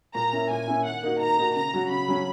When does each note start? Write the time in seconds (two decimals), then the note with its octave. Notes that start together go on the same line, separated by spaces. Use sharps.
0.15 A#2 A#5
0.33 A#3 C#4 E4
0.50 A#2 G#5
0.68 A#3 C#4 E4
0.85 D#3 F#5
1.03 A#3 D#4 F#4
1.21 D#3 A#5
1.38 A#3 D#4 F#4
1.56 C#3 A#5
1.73 F#3 C#4 F#4
1.90 C#3 B5
2.08 F#3 C#4 F#4